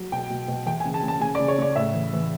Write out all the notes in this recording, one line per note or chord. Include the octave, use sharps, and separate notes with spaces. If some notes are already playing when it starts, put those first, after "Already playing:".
Already playing: F#3
B2 G5
B2
B2
E3 G5
G#5
C#3
A5
C#3
A5
C#3 G#5
D5
C#3
C#5
C#3 D5
A2 E5
E3
E3